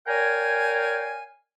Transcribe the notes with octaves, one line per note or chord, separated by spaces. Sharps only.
A#4 C#5 D5 F5 G5 G#5